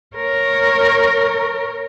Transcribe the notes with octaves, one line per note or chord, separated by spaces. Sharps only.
A#4 C#5